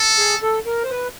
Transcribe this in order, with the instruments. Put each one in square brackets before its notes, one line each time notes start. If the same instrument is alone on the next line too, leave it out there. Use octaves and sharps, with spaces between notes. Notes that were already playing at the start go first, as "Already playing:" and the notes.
Already playing: [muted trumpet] A4
[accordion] G#4
A4
A#4
C5
B4